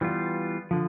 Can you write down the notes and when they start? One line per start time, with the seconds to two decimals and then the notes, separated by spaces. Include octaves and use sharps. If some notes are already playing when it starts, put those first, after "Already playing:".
0.01 E3 G3 B3 F4
0.71 D3 F3